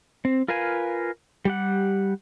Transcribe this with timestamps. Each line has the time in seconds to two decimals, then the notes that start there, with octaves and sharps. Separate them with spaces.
0.25 C4
0.48 F4 A#4 B4 F5 G#5
1.45 G3 G4 F#5